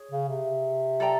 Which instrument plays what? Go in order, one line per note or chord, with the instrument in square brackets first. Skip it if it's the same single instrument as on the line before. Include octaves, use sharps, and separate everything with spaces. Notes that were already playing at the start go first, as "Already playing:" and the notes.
Already playing: [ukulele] G#4 C#5
[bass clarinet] C#3
C3
[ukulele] A4 D5 G5 A#5